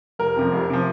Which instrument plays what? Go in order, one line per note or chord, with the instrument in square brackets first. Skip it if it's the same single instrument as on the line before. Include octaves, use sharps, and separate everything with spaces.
[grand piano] F1 A#4
F2 C3 F3
F1
C3 F3